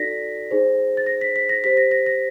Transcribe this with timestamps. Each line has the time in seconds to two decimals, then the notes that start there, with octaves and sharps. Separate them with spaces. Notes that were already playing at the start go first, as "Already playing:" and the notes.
Already playing: D#4 F#4 A4 D5 A#6 B6
0.51 D#4 G#4 C5
0.97 A6
1.06 A#6
1.21 B6
1.36 B6
1.49 A#6
1.64 G4 C5 B6
1.77 A#6
1.91 A#6
2.06 A#6